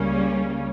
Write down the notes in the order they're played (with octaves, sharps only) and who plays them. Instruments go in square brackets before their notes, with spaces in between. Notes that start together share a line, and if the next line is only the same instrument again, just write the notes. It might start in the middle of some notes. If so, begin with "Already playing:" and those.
Already playing: [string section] C#2 C#3 G3 A#3 C#4